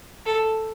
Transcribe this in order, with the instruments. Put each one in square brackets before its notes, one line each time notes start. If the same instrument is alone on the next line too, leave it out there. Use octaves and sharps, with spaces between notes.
[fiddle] A4